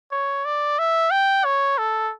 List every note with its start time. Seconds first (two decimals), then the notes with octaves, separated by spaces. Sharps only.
0.12 C#5
0.45 D5
0.79 E5
1.11 G5
1.45 C#5
1.78 A4